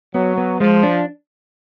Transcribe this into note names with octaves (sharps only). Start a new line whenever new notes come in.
F#3 B3
B3
F3 G#3
D4